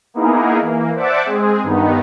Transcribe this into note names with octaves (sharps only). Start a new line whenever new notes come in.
A#3 B3 D#4 E4 G#4 A#4
E3 A#3
C5 D5 E5 F#5 A5 D6
G#3 C4 G#4
G2 D#3 B3 D#4